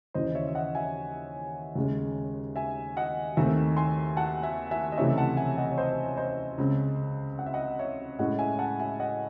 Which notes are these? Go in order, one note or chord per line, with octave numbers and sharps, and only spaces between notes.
D#2 C#3 E3 C5 D#5
C#5 E5
E5
D#5 F#5
E5 G#5
D#2 C#3 G#3
E5 G#5
D#5 F#5
D#2 D#3 A3 C4 E5 G#5
G#5 C6
F#5 A5
E5 G#5
E5 G#5
D#5
C#2 C3 E3 A3 C4 C#5 E5
F#5 A5
E5 G#5
D#5 F#5
C#5
C5 D#5
C5 D#5
C#2 C#3 G#3 C4
F#5
E5
D#5 F#5
C#5 E5
A2 G#3 C#4 D#5 F#5
E5 G#5
F#5 A5
E5 G#5
D#5 F#5